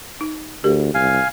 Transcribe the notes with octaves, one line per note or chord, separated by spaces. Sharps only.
D#4
D2 G4 A#4
C2 F5 G#5